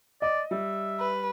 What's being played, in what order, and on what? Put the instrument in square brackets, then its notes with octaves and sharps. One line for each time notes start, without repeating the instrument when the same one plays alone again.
[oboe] D5 [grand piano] D#5
[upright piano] G3 [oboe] E5
[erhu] B4